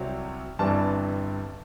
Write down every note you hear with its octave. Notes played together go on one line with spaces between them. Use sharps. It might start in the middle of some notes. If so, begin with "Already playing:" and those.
Already playing: C2 C3 F#3 C4
G1 G2 E3 G3 C4 A5